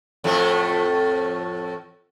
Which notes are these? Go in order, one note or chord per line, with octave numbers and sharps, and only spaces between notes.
F2 A2 A3